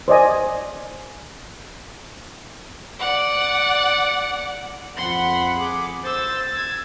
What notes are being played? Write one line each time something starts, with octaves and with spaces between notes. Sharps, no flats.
C5 D5 D#5 G#5
D5 F#5
F2 F#5 B5 C6
G#4 D6
C5 E6 A6
E6 G#6